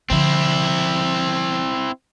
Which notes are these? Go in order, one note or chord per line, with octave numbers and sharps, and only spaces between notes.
D3 F3 C4 E4